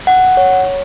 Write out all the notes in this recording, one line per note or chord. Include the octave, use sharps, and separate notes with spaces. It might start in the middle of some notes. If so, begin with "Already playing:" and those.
F#5
C#5